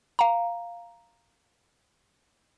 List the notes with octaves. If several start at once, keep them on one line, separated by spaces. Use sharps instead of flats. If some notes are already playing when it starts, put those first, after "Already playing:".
F5 A#5